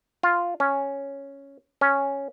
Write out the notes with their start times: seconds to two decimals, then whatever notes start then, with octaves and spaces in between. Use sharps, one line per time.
0.23 F4
0.60 C#4
1.81 C#4